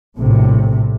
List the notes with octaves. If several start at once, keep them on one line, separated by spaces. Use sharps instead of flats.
A#1 A2 C3